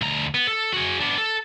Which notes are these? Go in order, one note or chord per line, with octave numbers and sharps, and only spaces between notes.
D2 A#5
B3
A4
F#4 G#4
B3 D4
A4